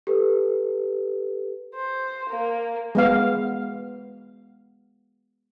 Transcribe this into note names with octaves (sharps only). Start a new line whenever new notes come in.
G4 A4 B4
C5
A#3
G#3 B3 F5